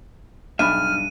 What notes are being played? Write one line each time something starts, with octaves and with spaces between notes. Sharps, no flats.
B1 G2 D4 E5 B5 F6 D#7